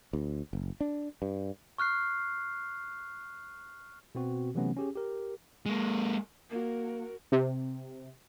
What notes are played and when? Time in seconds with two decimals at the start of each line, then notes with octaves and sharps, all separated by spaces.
0.13 D2
0.53 F#1
0.81 D4
1.22 G2
1.78 C#6 F6 F#6 C7
4.15 B2 B3 C4 F#4
4.55 C3 E3 F#3 A3 B3 C#4
4.76 C#4 G4 G#4
4.95 G4 A#4
5.66 G#3 A#3
6.50 A#3 F#4 A#4
7.32 C3